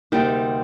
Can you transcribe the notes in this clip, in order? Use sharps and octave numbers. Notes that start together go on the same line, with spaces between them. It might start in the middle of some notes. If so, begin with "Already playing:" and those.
D2 C3 G3 A#3 D#4 G4